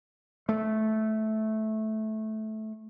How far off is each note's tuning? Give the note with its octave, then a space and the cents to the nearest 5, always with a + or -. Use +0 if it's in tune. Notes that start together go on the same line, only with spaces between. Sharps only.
A3 -15